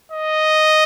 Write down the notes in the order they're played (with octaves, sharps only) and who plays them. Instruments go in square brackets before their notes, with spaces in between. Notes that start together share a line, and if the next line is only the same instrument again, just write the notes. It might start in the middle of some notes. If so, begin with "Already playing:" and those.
[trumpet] D#5